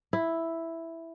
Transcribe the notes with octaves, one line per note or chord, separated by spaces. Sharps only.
E4